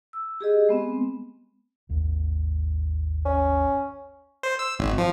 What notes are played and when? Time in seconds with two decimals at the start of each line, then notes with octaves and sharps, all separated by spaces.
0.13 E6
0.41 G4 G#4 D#5
0.69 G#3 B3 C4
1.89 G#1 D#2
3.25 C#4
4.43 C5
4.59 E6
4.79 G#1
4.98 F3